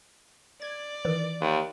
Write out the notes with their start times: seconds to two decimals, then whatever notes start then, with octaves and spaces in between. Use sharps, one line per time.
0.62 D5 G#6
1.05 D#3 E3
1.41 D#2